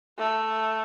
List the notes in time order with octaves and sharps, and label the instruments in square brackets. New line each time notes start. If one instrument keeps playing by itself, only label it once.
[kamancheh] A3